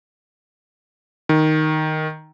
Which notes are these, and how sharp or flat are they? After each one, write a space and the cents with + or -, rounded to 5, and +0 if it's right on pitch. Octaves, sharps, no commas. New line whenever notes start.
D#3 +0